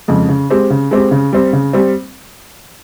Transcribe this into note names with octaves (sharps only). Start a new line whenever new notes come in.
F2 C#3 G#3
C#3
G#3 C4 G4
C#3
G#3 C4 G4
C#3
G3 C4
C#3
G3 C4